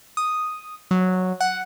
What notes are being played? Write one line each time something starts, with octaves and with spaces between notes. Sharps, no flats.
D#6
F#3
F#5